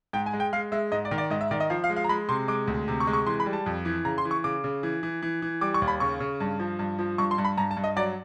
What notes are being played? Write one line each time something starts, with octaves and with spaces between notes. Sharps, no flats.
G#2 G5
G#5
G#3
G5
G#3 F5
G#3 E5
G#2 D#5
D5
D#3
D5
G#2 D#5
E5
D#3 D5
D#5
F3 F5
F5
G#3
F5
A#5
G#3 B5
C3 C6
G#3 D6
D2
C3
C#6
G#3
C#6
E3 C6
B5
G3
A5
F2
E3
C#3 A#5
C6
E3
C#6
C#3 D6
C#3
E3
E3
E3
E3
G3 D6
C#6
D#2
B5
C#3 C#6
C#3
G2
F3
G2
F3
G2 C#6
C6
G2
B5
G2 A#5
A5
G2
D#5
F#3 D5